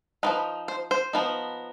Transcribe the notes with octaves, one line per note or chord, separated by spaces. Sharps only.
F3 C4 D#4 B4
C5
C5
F3 B3 D#4